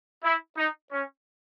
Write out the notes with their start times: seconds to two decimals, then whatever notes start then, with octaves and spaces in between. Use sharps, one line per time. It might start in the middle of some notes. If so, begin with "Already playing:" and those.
0.24 E4
0.57 D#4
0.92 C#4